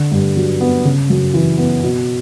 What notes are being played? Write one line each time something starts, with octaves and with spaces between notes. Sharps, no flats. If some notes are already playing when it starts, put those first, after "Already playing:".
Already playing: D3
G2
F#3
B3
C#3
F#2
E3
B3
B2